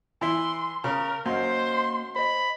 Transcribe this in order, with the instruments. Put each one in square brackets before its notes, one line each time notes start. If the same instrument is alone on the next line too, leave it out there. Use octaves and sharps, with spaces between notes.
[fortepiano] E3 E4 [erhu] C6
[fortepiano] C#3 [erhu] A#4
[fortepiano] F#2 [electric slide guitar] A#3 D#5 [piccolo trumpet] C5 [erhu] C6
[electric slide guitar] C5 D#5 [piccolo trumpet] B5